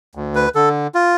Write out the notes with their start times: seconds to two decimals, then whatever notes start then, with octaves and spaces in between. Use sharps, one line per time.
0.15 D2
0.35 B4
0.55 D3 A4
0.95 F4